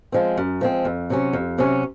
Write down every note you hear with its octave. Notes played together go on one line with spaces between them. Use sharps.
F3 G#3 C4
F#2
F3 G#3 C4
F2
C3 F#3 C#4
F2
C3 F#3 C#4